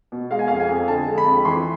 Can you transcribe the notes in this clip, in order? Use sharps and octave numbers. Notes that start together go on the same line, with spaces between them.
B2
G#3 F5
G#5
F2 F5
G#5
F2
D3 A5
G#3
B5
F2
E3 C6